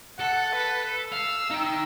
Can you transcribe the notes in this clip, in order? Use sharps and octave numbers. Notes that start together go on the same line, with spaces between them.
A4 F#5
B4
F5 E6
D#4 G5